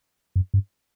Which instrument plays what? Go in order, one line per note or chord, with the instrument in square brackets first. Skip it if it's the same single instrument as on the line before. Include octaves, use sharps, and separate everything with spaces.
[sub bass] F#2
G2